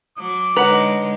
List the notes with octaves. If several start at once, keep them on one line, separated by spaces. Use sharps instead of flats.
F#3 D6
D3 G#3 D#4 B4 C#5 F#5 A#5